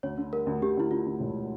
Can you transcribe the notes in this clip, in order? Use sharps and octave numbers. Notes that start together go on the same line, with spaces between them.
D2 C#5
D3
G3 A#4
D2
D2 G4
D2 E4
D3 F4
D2
E1